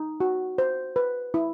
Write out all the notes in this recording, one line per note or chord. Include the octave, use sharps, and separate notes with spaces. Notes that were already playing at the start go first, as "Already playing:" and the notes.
Already playing: D#4
F#4
C5
B4
E4